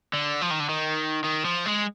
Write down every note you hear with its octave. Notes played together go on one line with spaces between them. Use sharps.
D3
F3
D#3
D3
D#3
D#3
F3
G#3